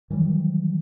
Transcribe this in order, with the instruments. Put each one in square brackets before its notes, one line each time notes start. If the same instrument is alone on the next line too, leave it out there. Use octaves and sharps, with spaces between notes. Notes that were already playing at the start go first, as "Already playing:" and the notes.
[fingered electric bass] D#3 E3 F#3 G3